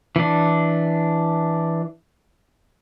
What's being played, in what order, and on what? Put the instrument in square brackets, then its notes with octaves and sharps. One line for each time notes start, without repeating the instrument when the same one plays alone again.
[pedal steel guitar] E3 D4